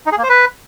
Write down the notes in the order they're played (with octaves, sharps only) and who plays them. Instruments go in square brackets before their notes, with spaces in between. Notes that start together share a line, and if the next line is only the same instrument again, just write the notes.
[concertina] D#4
G#4
A#3
C5
B4